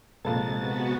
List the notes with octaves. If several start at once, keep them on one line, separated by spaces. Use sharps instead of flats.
A#1 C3 G#3 A4 A6
B3 F#4